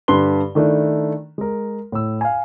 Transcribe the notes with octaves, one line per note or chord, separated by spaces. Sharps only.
G2 D3 G4 B4 C6 G7
D#3 A3 D4 E4
G#3 A#4
A2 E6
F5 G#5